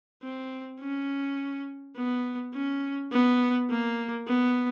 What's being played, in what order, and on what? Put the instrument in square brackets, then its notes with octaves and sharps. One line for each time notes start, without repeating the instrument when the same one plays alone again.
[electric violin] C4
C#4
B3
C#4
B3
A#3
B3